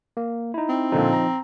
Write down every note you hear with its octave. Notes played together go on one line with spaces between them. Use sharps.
A#3
D#4 E4
C4
A#2 D3 F3 D#4 A4
A#5